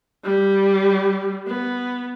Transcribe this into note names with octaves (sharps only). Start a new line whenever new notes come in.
G3
B3